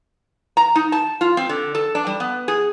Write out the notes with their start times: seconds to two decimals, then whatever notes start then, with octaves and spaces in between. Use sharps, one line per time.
0.57 A#5
0.75 D#4
0.92 A5
1.21 F4
1.37 C4
1.49 D3
1.75 A4
1.95 D4
2.07 G3
2.20 B3
2.48 G#4